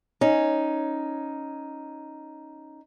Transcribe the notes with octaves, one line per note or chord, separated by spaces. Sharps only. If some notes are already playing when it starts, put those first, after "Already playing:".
C#4 D#4